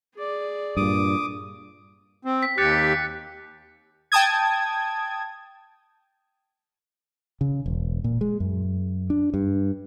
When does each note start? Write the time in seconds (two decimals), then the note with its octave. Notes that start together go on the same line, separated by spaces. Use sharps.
0.15 G#4 D5
0.77 G2 A#2 D6 D#6
2.25 C4
2.43 B6
2.58 D#2 G4 F#6 A6 C#7
4.12 G5 A5 D#6 G#6
7.41 C#3
7.66 E1
8.04 A#2
8.21 G#3
8.40 F#2
9.10 D4
9.34 G2